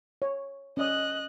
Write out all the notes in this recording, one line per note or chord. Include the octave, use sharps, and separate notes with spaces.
C#5
C#4 D5 D#5 D#6 F#6